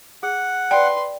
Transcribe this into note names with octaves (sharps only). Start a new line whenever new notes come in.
G#4 F#5
B4 D5 G5 C6